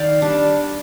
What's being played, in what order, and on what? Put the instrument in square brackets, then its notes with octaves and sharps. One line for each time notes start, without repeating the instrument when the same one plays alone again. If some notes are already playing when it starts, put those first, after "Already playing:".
Already playing: [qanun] D#3 D5 F5 G5
G3 D4